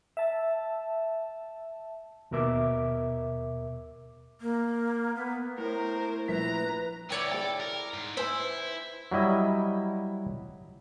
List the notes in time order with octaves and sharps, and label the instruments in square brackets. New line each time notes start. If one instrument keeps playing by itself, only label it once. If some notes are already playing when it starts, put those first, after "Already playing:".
[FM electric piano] E5 A5
[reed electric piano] D#2 B2 A#4 E5 D6
[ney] A#3
B3
[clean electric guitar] A2 [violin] A#4 C5 [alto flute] A#5
[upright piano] A#1 E4 B6 [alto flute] B4 [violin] A#5
[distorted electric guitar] A2 D3 [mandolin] E4 C#5 D5 [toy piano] G5
[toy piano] G#4 G5 [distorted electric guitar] A4
[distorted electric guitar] A#4
G#2
[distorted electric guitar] E4 [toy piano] B4 G#5 [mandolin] C5 B5 E6
[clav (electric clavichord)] F#3 G3 E4 D#5